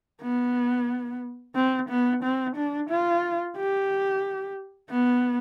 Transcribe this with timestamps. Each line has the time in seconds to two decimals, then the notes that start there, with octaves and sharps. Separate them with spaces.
0.22 B3
1.56 C4
1.90 B3
2.24 C4
2.56 D4
2.90 F4
3.57 G4
4.90 B3